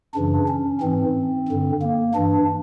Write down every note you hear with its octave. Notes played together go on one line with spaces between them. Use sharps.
F#2 C#3 E3 D4
C#4
G#2 E3 C4
G2 D3
A#3
G2 E3 D4